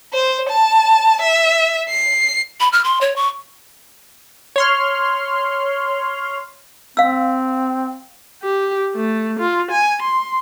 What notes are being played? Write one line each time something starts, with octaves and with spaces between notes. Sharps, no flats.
C5
A5
E5
C7
B5
F6
C6
C#5
C#6
C#5 C6 F6
C4 F5 E6
G4
A3
F4
G#5
C6